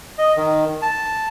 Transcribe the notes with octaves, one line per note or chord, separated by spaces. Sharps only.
D#5
D#3
A5